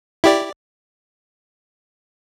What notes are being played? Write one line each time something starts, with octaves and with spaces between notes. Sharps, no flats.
E4 G4 D5